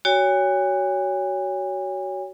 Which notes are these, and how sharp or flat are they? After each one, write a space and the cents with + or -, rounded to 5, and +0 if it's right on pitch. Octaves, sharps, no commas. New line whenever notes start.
F#4 +20 C#5 +20 G#5 -40